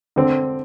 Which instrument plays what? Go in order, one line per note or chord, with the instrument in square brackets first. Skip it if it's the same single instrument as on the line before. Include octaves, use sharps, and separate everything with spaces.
[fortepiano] D3 C4